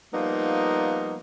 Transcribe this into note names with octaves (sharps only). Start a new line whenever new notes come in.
F3 G3 A#3 B3 D#4